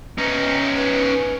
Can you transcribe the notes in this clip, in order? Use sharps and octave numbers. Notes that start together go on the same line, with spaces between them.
C#4 D#4 B4
B4